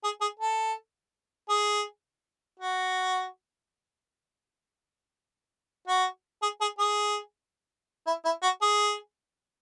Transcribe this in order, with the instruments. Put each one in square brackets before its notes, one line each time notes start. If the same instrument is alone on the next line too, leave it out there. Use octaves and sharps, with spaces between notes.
[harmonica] G#4
G#4
A4
G#4
F#4
F#4
G#4
G#4
G#4
E4
E4
F#4
G#4